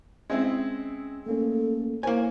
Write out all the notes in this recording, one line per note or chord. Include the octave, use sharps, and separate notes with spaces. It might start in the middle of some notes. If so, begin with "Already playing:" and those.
G#3 C4 C#4 E4
A3 A#3 C#4 A4
A#3 E4 A#4 C5 C#5 G#5